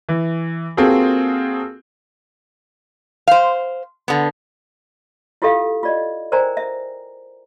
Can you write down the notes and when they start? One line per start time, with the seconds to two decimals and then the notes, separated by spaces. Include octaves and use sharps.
0.09 E3
0.77 A#3 C4 F4 F#4 G#4 A4
3.28 C5 F5
4.08 D3 B3
5.42 E4 F4 G4 A4 E5 F5
5.83 F4 D5 D#5
6.32 A#4 C5 D5 G5 G#5 A#5
6.57 E5